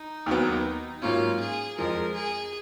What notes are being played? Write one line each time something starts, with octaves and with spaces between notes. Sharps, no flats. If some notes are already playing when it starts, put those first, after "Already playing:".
Already playing: D#4
D#2 D#3 F#3 B3
G#2 F#3 A#3 C#4 F4
G#4
F2 F3 G#3 A#4
G#4